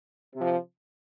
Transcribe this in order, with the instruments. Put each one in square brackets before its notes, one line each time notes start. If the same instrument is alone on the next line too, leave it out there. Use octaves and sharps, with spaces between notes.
[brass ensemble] C3 F3